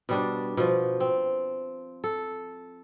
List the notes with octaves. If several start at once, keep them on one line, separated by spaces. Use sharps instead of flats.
B2 G3 D4
B2 F3
C4
A4